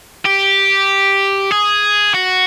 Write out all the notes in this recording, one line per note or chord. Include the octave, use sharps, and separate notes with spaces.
G4
G#4
F#4